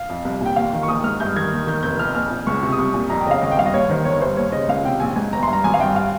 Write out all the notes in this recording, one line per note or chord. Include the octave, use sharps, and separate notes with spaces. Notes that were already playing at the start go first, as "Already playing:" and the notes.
Already playing: F5
F2
C2
A#2 G5
D#2 F5
D#3
C#6
A#1 D#6
G#2 F6
G2 G6
D#3 G#6
D#2
D#3 G6
F1 G6
F2 F6
A#1 F6
A#2
C#2 C#6
C3 C#6
D#6
C2 C#6
A#2
F2 A#5
G5
C#3 D#5 F5
G#1 D#5
G5
G2 F5
D#5
D#2 C#5
D#3 C5
G1 C#5
G2 C5
D#2 C#5
C#3 D#5
C#2 F5
C3 G5
A#1 G#5
G#2 G#5
G1 A#5
G2 C6
A#5
G#1 G#5
F5
G2 G5
F5